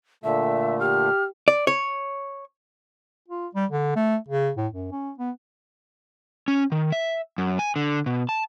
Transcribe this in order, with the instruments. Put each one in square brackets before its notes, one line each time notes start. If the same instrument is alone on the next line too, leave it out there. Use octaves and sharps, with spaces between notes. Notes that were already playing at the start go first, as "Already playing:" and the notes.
[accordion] A#2 D3 A3 [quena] E5
[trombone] G4 [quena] F6
[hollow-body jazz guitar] D5
C#5
[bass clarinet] F4
G3
D3
A3
C#3
A2
F#2
C#4
B3
[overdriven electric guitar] C#4
D#3
E5
F#2
G#5
D3
B2
A5